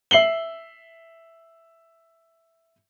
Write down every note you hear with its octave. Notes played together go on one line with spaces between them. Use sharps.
E5 C7 F#7 G7